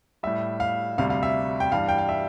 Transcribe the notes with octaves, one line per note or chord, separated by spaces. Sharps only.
A2 G3 E5
F5
D2 C3 G3 F5
F5
E5
G5
G2 E3 G3 F5
G5
F5
E5